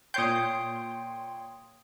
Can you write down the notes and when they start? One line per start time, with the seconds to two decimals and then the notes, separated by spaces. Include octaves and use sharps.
0.14 A#2 C#5 G5 C6 D#6 G6